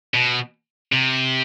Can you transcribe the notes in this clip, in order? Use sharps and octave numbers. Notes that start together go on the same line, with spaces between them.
B2
C3